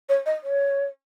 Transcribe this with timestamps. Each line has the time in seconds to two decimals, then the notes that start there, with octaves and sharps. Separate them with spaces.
0.09 C#5
0.26 D#5
0.43 C#5